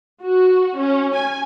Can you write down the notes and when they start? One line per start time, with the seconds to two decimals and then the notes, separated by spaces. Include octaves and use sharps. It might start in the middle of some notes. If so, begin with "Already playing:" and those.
0.23 F#4
0.78 C#4
1.14 G#5